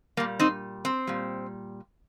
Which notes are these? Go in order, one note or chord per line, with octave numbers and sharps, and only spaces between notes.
A#2 G3 A#3
C4 D#4
C4
A#2 G3